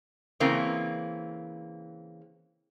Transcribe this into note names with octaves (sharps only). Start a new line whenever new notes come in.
C#3 E3 A#3 C4